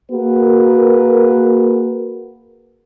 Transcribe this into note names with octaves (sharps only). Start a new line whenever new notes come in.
A#3 F#4 G#4 A#4 B4